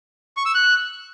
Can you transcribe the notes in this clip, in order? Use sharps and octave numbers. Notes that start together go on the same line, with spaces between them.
C#6
E6
F#6